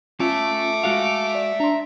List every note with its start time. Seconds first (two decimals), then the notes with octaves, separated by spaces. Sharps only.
0.20 C#4 F4 E5 A5 D6
0.83 G#3 F#4 F5
1.35 D5
1.60 D4 A#5 C6